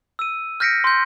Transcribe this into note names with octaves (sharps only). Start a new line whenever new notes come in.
E6 D#7
F6 G6 A#6 B6 C#7 D7
C6 G6